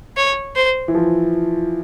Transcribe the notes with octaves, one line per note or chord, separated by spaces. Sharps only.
C#5
C5
E3
F3